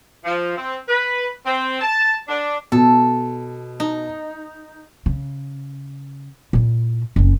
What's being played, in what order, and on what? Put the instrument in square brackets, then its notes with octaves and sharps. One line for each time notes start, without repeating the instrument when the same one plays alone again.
[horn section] F3
C4
B4
C4
A5
D4
[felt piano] B2 [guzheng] A4
[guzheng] D#4
[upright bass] C#3
A#2 E4
F#1 C#4